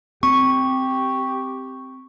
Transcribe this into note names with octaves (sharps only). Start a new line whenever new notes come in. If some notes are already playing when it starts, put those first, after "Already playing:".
C4 G4 C#6